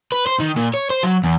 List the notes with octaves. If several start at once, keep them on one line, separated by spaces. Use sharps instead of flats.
B4
C5
D#3
A#2
C#5
C5
F#3
E2